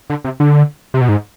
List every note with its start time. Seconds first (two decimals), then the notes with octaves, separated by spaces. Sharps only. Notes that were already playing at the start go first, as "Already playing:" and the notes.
0.10 D3
0.24 C3
0.40 D3
0.94 C3
1.01 B2
1.09 G#2